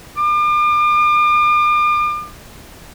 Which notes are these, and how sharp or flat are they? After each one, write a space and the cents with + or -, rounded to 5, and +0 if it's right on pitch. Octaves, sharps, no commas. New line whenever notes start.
D6 +40